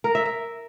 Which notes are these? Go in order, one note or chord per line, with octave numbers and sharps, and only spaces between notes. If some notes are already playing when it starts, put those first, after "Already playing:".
A#4
E5
E5